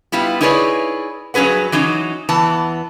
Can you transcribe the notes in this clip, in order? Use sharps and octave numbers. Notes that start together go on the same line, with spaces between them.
G3 B3 E4 F4
D#4 E4 G#4 B4 C#5 D5
G2 F#3 C#4 G#4 B4 F#5
E3 F#3 C#4 D#4
E2 E3 B3 A5